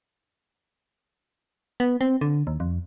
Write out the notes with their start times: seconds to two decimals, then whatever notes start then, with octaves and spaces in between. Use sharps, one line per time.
1.80 B3
2.01 C4
2.21 D3
2.47 D#2
2.60 F2